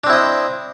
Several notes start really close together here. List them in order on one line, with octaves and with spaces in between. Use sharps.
D4 C4 E4 D#5